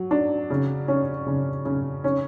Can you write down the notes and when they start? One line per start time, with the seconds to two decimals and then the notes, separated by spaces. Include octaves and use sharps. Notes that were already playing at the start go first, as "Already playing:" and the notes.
Already playing: F#3
0.11 D4
0.50 C#3
0.88 C#4
1.26 C#3
1.65 C#3
2.04 C#4